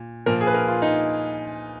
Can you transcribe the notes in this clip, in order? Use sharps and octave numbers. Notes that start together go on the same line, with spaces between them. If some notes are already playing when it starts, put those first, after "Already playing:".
Already playing: A#2
A#2 F3 A#4
G#4
B4
A#4
F4
D#4